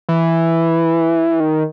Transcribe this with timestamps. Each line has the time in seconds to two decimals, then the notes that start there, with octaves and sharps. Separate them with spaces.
0.09 E3
1.40 D#3